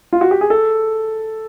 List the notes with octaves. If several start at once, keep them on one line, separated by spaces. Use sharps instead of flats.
F4
F#4
G4
G#4
A4